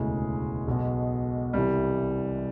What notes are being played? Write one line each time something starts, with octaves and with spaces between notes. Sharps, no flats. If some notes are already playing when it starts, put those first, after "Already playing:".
Already playing: E1 D2 C#3 E3 G#3
B1 B2
C2 C3 E3 G3